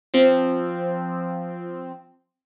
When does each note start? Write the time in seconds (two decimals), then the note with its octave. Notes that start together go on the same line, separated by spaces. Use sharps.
0.14 F3 C4